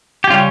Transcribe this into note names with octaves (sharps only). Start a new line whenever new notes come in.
G4
C#3 G3 C#4 F4